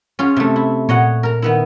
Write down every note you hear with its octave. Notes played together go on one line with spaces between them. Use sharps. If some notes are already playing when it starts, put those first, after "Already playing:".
C#4 F4 G#4
C3 A3
E4
A#2 C#5 D#5 F#5
A#4 A#5
D#3 B3 E4